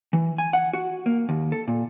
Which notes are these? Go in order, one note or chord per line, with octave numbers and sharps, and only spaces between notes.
E3
G#5
F#5
F#4
A#3
D#2
A4
A#2